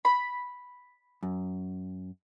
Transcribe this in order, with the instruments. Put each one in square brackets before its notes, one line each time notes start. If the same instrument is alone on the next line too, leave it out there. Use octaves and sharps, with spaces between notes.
[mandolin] B5
[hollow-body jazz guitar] F#2